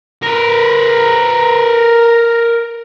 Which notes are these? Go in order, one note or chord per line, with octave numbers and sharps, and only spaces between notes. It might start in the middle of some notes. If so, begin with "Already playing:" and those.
A#4 B4